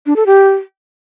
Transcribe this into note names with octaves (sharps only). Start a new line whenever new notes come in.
D4
A4
G4